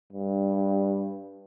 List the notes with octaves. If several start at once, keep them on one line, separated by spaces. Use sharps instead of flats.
G2